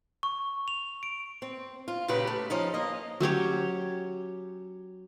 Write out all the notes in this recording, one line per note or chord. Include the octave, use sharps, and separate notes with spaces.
C#6
F7
D7
C4
F4
A#2 C#3 F#4 G4 B4
A3
F3 C#4 D#4
A#3 D#5
F#3 C#4 G4 C#5